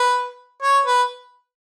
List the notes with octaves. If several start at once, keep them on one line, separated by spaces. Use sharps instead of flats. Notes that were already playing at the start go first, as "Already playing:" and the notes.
Already playing: B4
C#5
B4